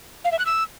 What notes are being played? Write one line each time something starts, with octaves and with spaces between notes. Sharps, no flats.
F5
E5
F#6
E6